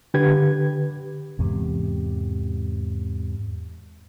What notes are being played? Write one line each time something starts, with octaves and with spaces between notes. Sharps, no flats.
D3 G4 B4 G#6
E2 G#2 C3